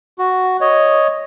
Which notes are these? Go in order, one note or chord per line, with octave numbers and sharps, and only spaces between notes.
F#4
C#5 D#5